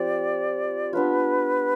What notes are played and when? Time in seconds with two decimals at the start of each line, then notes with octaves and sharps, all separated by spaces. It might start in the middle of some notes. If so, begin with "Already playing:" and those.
Already playing: F3 C4 G4 D5
0.93 B3 D4 F4 B4